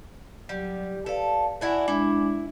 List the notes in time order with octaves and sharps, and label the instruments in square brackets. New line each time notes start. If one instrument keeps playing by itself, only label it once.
[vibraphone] F#3 [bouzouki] G3
[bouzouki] A4 [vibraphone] B4 D5 F5
[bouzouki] D4 E4 F#4 [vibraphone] D5 G#5
[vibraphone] G#3 D4 D6 [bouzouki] E4